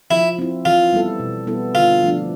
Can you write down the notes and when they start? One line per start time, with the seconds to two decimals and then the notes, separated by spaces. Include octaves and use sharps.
0.10 F3 E4
0.39 C4 E4
0.65 E3 F4
0.93 G3 B3 E4 A4
1.19 B2
1.47 G3 B3 E4 A4
1.75 D3 F4
2.03 F3 A3 D4